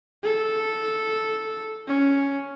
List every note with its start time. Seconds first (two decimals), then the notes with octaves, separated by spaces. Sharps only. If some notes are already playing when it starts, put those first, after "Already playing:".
0.23 A4
1.87 C#4